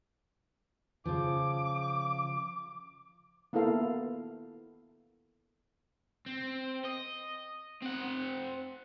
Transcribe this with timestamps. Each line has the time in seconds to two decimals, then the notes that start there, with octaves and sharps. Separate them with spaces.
1.05 C#3 F3 D6
3.53 A#3 B3 E4 A4 F5
6.26 C4
6.85 D#5
7.82 C4 F#5